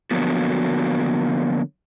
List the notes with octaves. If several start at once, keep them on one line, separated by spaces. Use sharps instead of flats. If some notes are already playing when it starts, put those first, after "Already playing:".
D3 F3 F#3 A#3 B3 F#4